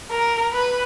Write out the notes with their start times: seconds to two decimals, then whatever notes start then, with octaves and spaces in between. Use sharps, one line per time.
0.10 A#4
0.53 B4